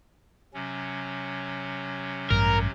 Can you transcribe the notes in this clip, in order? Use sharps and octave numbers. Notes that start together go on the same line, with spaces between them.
C3 F#3 C#4
A1 G2 A#4